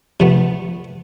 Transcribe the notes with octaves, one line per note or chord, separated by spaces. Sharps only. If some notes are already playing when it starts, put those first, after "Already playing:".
C3 F3 A3 B3